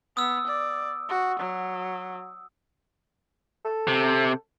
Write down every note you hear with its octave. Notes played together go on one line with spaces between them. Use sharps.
B3 D#6 E6
D5
F#4
F#3
A4
C3